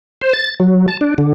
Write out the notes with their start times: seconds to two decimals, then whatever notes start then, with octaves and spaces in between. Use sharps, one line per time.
0.21 C5
0.33 A6
0.60 F#3
0.88 A5
1.01 D4
1.18 D3